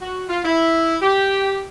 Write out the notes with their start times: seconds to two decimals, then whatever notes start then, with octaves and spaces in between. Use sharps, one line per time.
0.01 F#4
0.28 F4
0.44 E4
1.02 G4